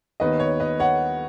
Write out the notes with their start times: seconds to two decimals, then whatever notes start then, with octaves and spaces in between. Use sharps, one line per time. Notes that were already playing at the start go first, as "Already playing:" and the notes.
0.20 D#2 D#3 B3 B4 D#5
0.40 C#5
0.60 B4 D#5
0.80 C#5 F#5